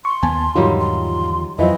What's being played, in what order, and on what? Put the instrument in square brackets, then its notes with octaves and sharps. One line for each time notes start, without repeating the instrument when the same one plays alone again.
[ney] C6 [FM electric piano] C#6
[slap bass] D#2 B3 [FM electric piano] G#5 A5
[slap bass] E2 D3 [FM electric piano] G#2 F4 [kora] D#3 F#3 G3
[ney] C6
[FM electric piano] F2 F#3 F4 [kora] E3 C4 [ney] D#5